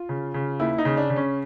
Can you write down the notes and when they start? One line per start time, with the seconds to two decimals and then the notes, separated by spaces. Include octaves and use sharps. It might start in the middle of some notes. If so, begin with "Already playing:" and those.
Already playing: F4
0.09 C#3
0.34 C#3
0.60 D#2 E4
0.78 D#4
0.85 C#3
0.97 D4
1.10 C#3
1.16 C#4